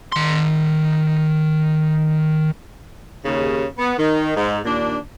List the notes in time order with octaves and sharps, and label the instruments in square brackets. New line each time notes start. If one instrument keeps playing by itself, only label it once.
[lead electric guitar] D#3 C6
[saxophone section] D#2 C#3
B3
D#3
G#2
D#2 A#2 D4